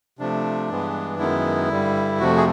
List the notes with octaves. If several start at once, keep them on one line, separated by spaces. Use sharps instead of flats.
C3 F3 A3 D4
G2 E3 G#3 B3
F#2 D#3 G#3 B3 E4
G2 D3 G3
F2 C3 F3 A3 F#4
G#4